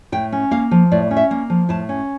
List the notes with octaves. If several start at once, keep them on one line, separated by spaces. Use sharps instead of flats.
A2 G5
C#4
A#3 F5
F3
A2 D5
C#4
E5
A#3
F3
A2 A5
C#4